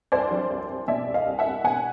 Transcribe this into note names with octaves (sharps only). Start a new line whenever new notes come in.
C2 C5 D5
F#3
C2
C2
B2 D5 E5
C2
D#5 F5
C2
E5 F#5
C2
B2 F#5 G#5